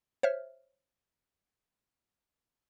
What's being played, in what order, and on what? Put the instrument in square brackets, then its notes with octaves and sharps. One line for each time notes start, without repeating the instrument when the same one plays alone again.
[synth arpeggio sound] C5 C#5 E5 F6